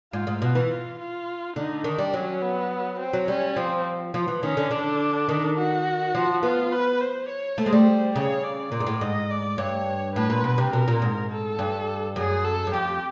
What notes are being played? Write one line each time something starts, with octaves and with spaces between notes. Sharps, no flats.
G#2 F4
G#2
B2 F4
E3
F4
F4
D3 D#4
D#3 D4
G3
F#3 C#4
B3
C4
F#3
G3 C#4
F3 C4
F3
E3
D#3 C#4
D3
D3 D4
D#3
F#4
F3
B3 F4
B4
C5
C#5
A3 C5
G#3
G3
C#3 C#5
D5
A#2 D5
G#2
A2
G#2 D#5
D5
G2 C#5
A2 B4
A#2
B2
C3
B2 A#4
A#2
G#2
A4
G2
F#2 G#4
A4
F#2
F2 G4